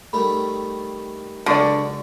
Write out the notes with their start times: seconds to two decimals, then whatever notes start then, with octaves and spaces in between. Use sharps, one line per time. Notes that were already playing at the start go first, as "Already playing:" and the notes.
0.13 D#3 G3 A3 B5
1.46 C#2 D3 F#3 F#4 D5